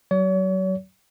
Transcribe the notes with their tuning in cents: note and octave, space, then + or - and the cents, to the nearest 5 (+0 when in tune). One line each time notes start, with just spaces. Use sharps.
F#3 +30 C#5 +40